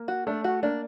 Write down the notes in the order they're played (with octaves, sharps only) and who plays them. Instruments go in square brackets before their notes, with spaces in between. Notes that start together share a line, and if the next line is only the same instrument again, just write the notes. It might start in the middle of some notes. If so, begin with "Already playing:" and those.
Already playing: [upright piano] A#3
[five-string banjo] F#4
[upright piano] A3 [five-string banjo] D4
[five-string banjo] F#4
[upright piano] A#3 [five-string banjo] D4